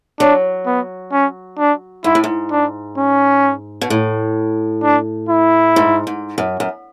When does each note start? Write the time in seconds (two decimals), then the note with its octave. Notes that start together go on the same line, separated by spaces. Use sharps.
0.20 F#3 D4
0.66 B3
1.12 C#4
1.59 D4
2.04 G#2 E4
2.15 A2
2.24 G#2
2.51 D4
2.98 C#4
3.81 B2
3.90 A2
4.83 D4
5.29 E4
5.76 G#2
6.07 G#2
6.38 F#2
6.60 F#2